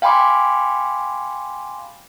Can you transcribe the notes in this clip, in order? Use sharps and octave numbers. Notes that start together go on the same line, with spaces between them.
F5 G5 G#5 B5 C6 D6